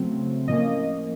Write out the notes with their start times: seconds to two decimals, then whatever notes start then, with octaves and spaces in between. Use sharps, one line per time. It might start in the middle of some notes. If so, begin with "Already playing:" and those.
Already playing: C#3 F#3 A3 C4
0.48 A2 F3 A#3 C#4 D#5